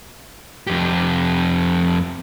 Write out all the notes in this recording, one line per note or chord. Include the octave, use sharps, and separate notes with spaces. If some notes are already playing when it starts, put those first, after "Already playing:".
F2 G4